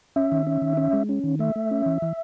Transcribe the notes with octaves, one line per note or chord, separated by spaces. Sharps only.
C#4 E5
D#3
C#4
D#3
C#4
G#3
C#4
D#3
A3 E5
A3
C#4
E3
E3